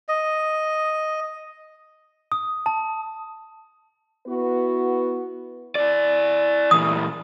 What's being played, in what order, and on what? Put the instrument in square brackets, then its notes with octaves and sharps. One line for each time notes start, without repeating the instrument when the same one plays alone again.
[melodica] D#5
[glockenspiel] D#6
A5
[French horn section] B3 E4 F#4 B4
[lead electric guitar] E4 D5
[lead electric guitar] A#2 E3 [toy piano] D#6